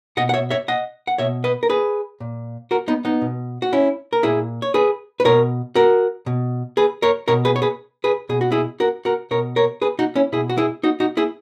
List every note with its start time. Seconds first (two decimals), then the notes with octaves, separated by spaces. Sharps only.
0.17 B2 D#5 F#5
0.29 F#5
0.34 C#5 E5
0.50 C#5 E5
0.68 D#5 F#5
1.07 F#5
1.18 B2 C#5 E5
1.44 B4 D#5
1.63 A#4
1.69 G#4 B4
2.20 A#2
2.71 F#4 A#4
2.88 B3 D#4
3.05 B3 D#4
3.22 B2
3.62 F#4
3.73 C#4 E4
4.13 A#4
4.23 A#2 E4 G#4
4.62 C#5
4.74 G#4 B4
5.20 B4
5.25 B2 A#4 C#5
5.75 F#4 A#4
6.26 B2
6.77 G#4 B4
7.02 A#4 C#5
7.28 B2 A#4 C#5
7.45 G#4 B4
7.56 C#5
7.62 G#4 B4
8.04 G#4 B4
8.29 B2 G#4
8.41 F#4
8.52 E4 G#4
8.80 F#4 A#4
9.05 F#4 A#4
9.31 B2 A#4 C#5
9.56 A#4 C#5
9.82 G#4 B4
9.99 D#4 F#4
10.15 C#4 E4
10.32 B2 E4 G#4
10.50 F#4
10.58 E4 G#4
10.83 D#4 F#4
11.00 D#4 F#4
11.17 E4 G#4